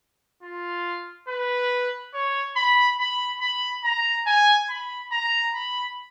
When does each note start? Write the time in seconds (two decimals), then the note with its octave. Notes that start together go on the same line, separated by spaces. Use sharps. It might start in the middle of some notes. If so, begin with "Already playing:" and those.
0.43 F4
1.28 B4
2.14 C#5
2.56 B5
2.99 B5
3.41 B5
3.84 A#5
4.27 G#5
4.70 B5
5.12 A#5
5.55 B5